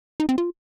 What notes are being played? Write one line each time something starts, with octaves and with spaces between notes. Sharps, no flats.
D#4
C4
F4